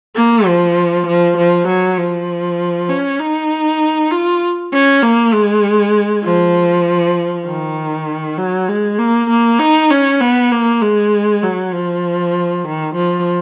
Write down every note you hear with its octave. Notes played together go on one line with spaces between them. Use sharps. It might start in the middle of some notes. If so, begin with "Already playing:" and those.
A#3
F3
F3
F3
F#3
F3
C#4
D#4
F4
C#4
A#3
G#3
F3
D#3
F#3
G#3
A#3
A#3
D#4
C#4
B3
A#3
G#3
F#3
F3
D#3
F3